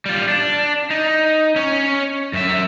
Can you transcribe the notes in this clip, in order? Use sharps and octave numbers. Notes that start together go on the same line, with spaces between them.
G3 F4
D4
D#4
C#4 C#5
F#2 E5